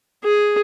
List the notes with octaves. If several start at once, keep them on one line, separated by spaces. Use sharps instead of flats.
G#4